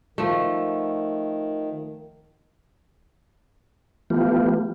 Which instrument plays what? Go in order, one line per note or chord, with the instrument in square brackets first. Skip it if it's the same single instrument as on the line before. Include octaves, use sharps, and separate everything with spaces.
[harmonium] D#3 [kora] F3 A3
[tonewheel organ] E3 F3 A3 B3 F4 G4